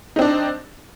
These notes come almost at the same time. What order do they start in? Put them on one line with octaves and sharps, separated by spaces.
D#4 C4 D4